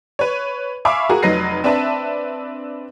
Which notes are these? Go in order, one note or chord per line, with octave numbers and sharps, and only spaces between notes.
B4 C#5
E5 F5 G#5 B5 C#6 D6
F#4 G#4 A#4
F1 F#3 D#4 B4 A#6 C7
C4 D4 B4 E5 A5